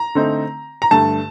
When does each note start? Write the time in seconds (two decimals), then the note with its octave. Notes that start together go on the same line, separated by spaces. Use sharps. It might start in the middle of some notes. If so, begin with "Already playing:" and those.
Already playing: A#5
0.15 D3 A3 C4 D#4
0.82 A#5
0.91 G2 D3 A3 A5